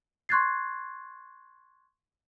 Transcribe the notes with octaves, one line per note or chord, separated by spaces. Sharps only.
C6 C#6 F#6 G#6 A6 C7